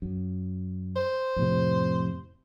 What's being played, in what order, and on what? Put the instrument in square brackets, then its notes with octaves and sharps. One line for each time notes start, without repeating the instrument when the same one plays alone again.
[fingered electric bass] F#2
[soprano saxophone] C5
[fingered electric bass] F2 A2 C3